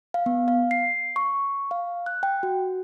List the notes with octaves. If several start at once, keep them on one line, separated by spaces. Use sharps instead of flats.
F5
B3
F5
C7
C#6
F5
F#6
G5
F#4